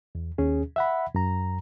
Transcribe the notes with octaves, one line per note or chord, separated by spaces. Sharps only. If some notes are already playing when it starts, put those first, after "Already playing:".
E2
D#2 C#4 G#4
E5 F#5 B5
F#2 A#5